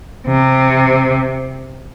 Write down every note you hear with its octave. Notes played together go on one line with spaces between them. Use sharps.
C3